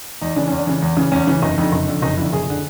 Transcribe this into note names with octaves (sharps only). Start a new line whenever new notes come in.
E2 D#4
C#3 E3 D4
E2 C#4
D4
C#3 E3
E2
C#3 E3
E2 C#4
C#3 E3
F#1 D#4
F2 D3 D#4
F#1
F2 D3
F#1 D#4
F2 D3 E4
F#1 G#4
D3